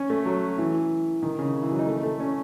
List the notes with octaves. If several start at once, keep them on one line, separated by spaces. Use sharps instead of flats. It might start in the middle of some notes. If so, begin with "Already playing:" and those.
Already playing: C#4
A3
F#3
E3
D#3
C#3
E3
F#3
D#4
A3
A3
C#4